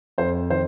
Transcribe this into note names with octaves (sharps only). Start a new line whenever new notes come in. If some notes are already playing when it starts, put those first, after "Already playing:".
F2 C5
D#3 C5